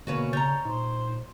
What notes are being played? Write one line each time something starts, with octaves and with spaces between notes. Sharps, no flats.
B2 D3 A#3 C#4 F#4 B4 C#5
C#3 C#5 A#5 G6 A6
A#2 D#4 C5